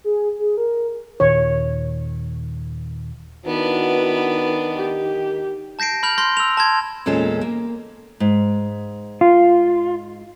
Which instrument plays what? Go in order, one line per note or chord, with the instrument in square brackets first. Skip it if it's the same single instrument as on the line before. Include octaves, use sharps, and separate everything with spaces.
[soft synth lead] G#4
G#4
A#4
[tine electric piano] D#2 A#2 D#3 [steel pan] C#5
[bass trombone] D#3 [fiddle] B3 D4 [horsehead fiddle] E4 F#4 [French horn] B4
[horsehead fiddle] G4
[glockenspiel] A5 G6 A#6 C7 D7
B5 F6 G6 F7
C6 F6 G6 A#6
E6 F7
A5 C6 G#6
[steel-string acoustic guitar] E2 A#2 G#3 C#4 A4 C5
A#3
[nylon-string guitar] G#2
[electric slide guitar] F4